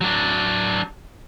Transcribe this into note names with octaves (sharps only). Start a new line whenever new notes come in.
F#3 D4